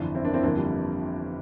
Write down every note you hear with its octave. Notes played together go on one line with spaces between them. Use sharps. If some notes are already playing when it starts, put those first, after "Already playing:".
Already playing: G1 F2 E3 D4 F4
C4 E4
A#3 D4
C4 E4
G1 F2 E3 A#3 D4
G3 A#3